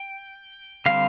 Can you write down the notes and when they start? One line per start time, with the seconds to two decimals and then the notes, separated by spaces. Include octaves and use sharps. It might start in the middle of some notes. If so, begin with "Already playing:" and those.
Already playing: G5
0.86 D3 G3 C4 F5